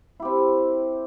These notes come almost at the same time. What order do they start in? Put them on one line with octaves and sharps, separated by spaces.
E4 G4 C4 E5